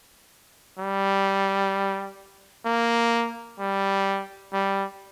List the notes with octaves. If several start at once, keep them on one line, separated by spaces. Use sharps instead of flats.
G3
A#3
G3
G3